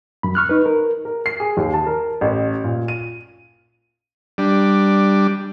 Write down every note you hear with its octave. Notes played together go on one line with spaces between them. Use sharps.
F#2 B5
C#6 F6 F#6
D#4 B4
A#4
A#4
C7
G#4
D#2
A5
A#4
A1
A#2
D#7
G3 D4